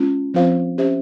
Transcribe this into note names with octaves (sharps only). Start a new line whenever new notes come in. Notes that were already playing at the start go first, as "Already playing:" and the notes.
Already playing: G#3 C#4 F4
F3 C4 F4 C5 F5
C#4 G4 C5 E5